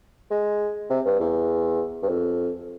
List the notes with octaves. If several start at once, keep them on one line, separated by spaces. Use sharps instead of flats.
G#3
C3
G2
E2
G2
F2